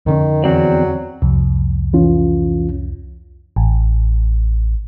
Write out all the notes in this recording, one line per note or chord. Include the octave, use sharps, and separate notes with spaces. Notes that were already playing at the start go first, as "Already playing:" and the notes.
F2 D3 D#3 C#4
E2 F#3 C4 D5
C2 F2
E3 C#4 F4
A1